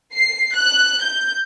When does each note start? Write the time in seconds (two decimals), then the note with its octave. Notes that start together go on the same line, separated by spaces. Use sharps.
0.15 C7
0.56 F#6
1.04 G6